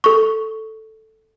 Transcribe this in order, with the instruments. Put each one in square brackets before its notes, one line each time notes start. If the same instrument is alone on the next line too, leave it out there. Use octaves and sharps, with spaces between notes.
[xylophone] A4 C#6